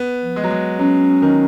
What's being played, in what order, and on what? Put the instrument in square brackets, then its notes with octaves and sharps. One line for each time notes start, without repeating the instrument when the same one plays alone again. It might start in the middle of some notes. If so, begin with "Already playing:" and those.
Already playing: [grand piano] B3
[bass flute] F3
[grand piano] G#3
F#3
G#3
[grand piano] F#3 [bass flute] C#4
[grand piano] D#3